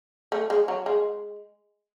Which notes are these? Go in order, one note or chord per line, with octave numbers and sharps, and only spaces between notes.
A3
G#3
F#3
G#3